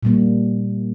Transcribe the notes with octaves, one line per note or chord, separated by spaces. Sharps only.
A#2 G3 A#3